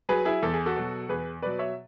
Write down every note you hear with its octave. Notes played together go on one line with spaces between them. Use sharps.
F#3 G#4 B4
E4 G#4
E2 A4
G#4
F#4 A4
B2 F#3
E2 G#4 B4
B2 F#3 B4 D5
C#5 E5